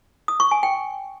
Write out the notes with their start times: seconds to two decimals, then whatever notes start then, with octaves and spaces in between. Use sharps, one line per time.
0.28 D#6
0.40 C#6
0.51 G#5
0.63 G5